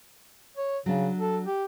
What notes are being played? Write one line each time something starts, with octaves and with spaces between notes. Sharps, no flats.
C#5
C#3 F#3 D4
A4
G4